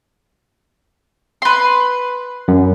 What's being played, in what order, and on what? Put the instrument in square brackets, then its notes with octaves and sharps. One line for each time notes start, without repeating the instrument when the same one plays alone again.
[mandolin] B4 C6
[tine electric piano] F#2